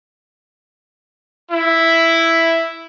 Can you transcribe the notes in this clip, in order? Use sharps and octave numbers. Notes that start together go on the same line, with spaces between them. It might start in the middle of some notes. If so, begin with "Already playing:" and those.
E4